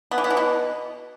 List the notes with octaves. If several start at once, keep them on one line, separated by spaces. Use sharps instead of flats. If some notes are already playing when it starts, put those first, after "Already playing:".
B3
E3
B3
E3
B2